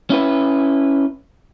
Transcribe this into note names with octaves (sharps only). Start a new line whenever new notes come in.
C#4 E4 B4